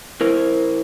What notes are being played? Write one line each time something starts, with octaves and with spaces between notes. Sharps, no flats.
E4 A#4 C5